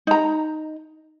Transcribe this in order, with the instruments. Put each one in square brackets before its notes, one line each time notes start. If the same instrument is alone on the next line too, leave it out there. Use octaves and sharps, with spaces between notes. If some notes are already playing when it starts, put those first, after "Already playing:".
[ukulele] D#4 A#5